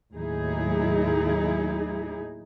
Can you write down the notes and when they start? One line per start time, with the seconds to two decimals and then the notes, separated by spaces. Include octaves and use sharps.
0.14 D#2 A2 F#3 D#4 E4 G#4